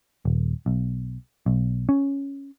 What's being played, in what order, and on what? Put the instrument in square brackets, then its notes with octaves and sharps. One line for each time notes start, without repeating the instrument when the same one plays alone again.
[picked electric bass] D#1
B1
B1
C#4